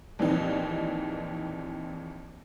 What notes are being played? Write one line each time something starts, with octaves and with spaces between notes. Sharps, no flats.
A#1 D#2 E3 C4 D#4